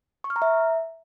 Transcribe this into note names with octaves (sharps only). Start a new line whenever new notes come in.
C#6
F6
A#5
E5